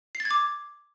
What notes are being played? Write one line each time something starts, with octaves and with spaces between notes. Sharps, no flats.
C7
A6
G#6
D6